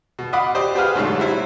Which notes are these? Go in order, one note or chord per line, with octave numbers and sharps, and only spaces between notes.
B2
F4 D#5 F#5 B5 D6
G4 C5 D5 D#5
G4 G#4 B4 C5 F5
D2 G#2 B2 F#3 A3
F#3 G3 E4 C5